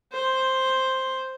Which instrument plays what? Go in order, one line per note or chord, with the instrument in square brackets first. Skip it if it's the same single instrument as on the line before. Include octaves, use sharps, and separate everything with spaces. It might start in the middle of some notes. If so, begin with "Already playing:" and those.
[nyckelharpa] C5